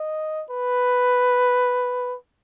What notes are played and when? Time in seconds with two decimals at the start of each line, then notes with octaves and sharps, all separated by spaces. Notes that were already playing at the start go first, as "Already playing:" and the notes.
Already playing: D#5
0.50 B4